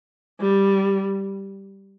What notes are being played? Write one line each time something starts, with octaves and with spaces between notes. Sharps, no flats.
G3